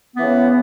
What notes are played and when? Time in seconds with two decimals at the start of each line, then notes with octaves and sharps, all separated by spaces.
0.15 B3
0.19 E3
0.23 C#3